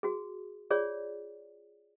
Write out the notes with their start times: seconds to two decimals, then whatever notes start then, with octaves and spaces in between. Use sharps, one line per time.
0.03 F#4 G#4
0.70 F4 G#4 C#5 D5